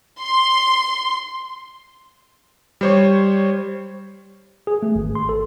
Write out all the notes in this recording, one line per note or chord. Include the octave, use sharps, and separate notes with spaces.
C6
G3 C5 C#5
G#4
A3
G#1
C6
A4